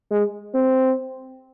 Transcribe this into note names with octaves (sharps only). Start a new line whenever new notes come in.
G#3
C4